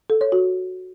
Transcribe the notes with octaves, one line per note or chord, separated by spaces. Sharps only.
A4
C#5
F#4